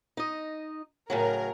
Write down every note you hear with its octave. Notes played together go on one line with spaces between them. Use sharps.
D#4 D#5
A2 C#3 F#3 A#4